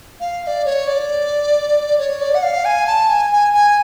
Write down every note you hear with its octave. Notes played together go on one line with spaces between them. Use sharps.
F5
F5
D5
C#5
D5
C#5
D5
F#5
F5
G#5
A5
G#5
G#5
G#5